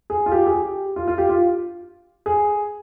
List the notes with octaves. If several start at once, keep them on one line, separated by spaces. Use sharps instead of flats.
G#4
F4
G4
G#4
G4
F4
F4
G4
F4
G#4